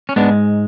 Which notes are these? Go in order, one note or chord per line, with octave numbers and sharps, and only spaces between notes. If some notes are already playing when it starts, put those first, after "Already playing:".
C#4
G#2 G#3 B3 D4